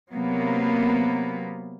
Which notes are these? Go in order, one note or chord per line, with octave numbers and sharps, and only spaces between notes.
C3 F#3 A#3 B3